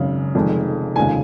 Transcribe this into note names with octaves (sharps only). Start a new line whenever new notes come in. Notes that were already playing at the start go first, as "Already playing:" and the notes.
Already playing: G#1 F#2 C#3
F1 F2 D#3 G#3
F1 D#2 C#3 F3 G#3 G#5